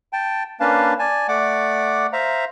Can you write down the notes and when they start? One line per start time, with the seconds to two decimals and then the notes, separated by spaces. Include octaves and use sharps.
0.13 G5 A5
0.60 A#3 C#4 D4 B4 F5 A5
0.99 D5 G#5 A5
1.28 A3 D5 F#5 D6
2.13 C5 E5 F5 A#5